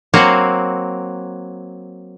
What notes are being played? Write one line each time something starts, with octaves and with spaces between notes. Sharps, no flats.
F#3 A#3 C4 F#4